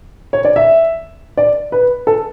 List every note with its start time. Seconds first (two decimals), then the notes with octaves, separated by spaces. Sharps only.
0.33 C#5
0.45 D5
0.56 E5
1.37 D5
1.72 B4
2.07 A4